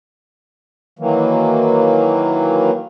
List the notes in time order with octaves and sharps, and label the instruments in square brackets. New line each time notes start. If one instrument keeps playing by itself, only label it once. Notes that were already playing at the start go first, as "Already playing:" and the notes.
[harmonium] D#3 E3 F#3 A#3